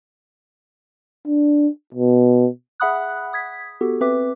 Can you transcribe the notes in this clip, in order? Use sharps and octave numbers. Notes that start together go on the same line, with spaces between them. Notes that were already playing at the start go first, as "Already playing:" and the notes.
D4
B2
G#4 E5 F#5 B5 D#6 F#6
D#6 G#6 B6
B3 F#4 G4 A4
C4 B4 E5 D6